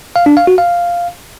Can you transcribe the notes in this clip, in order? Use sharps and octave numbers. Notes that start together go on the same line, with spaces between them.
F5
D4
F5
F#4
F5